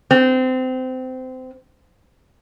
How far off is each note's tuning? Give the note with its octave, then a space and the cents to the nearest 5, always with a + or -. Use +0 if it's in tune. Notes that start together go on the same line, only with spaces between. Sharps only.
C4 -25